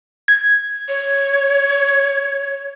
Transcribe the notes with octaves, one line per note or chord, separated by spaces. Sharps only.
G#6
C#5